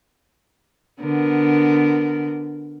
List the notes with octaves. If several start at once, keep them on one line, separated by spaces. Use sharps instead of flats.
D3 B3 A#4